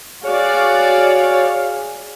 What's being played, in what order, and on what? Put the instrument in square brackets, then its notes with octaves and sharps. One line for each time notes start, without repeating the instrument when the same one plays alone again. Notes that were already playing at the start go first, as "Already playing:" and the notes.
[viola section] F#4 D5 [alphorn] G#4 [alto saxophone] C#5 [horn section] F5